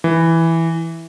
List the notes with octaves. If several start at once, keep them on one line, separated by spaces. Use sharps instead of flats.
E3